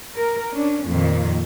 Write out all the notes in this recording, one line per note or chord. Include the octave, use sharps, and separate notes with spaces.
A#4
C#4 D4
F2 A#2 D#3